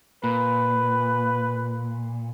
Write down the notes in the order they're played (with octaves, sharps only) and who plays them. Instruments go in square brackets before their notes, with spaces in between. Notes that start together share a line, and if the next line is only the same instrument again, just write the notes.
[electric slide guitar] A#2 [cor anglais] B4